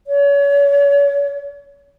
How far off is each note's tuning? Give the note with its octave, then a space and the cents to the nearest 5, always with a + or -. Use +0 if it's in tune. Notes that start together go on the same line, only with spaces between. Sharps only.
C#5 +35